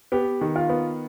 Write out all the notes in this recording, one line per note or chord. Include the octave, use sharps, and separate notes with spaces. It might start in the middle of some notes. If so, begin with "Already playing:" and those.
B3 G4
D#3
F4
B3